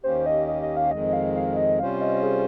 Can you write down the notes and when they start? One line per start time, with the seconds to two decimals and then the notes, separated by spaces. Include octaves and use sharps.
0.04 D#2 D#3 A#3 C#4 G4 C5
0.26 D#5
0.47 D#5
0.62 D#5
0.77 F5
0.91 F2 D#3 G#3 D#5
1.13 F5
1.36 F5
1.57 D#5
1.79 C3 G3 C#4 F4 C5 F5
2.01 D#5
2.23 G#4